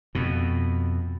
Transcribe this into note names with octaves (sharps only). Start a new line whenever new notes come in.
F2 B2